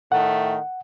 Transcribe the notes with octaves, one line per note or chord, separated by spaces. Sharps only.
A2 D#3 A3 F#5